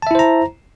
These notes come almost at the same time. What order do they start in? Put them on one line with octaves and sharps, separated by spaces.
A5 E5 E4 C5 A#5